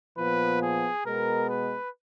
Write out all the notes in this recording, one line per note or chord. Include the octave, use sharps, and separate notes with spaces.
A#2 F3 B3 B4
G#4
B2 G#3 B3 A#4
B4